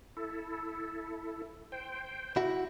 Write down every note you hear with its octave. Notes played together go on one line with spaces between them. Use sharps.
E4 A4
C5 G5
E4 F#4